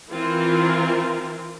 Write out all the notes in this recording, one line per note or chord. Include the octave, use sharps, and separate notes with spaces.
E3 C4 F4 A#4